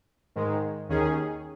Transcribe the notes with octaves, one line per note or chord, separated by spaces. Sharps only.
G#2 D#3 G#3
D#2 D#3 C#4 G#4